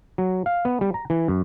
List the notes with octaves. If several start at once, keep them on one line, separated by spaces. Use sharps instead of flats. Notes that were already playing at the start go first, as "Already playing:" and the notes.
F#3
F5
B3
G3
A#5
E3
F#2